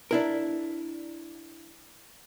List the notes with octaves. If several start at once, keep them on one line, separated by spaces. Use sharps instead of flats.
D4 E4 A#4